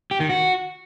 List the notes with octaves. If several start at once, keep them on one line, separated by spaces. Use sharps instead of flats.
G4
D#3
F#4